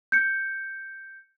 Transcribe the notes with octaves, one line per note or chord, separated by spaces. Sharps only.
G6 C#7